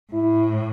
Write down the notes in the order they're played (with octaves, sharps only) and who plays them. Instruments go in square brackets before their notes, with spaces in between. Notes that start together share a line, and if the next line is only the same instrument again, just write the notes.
[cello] A2 [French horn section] E4